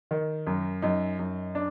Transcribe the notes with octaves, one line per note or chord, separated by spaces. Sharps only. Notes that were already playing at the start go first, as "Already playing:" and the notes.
D#3
F#2
F#2 D#4
F#2
D4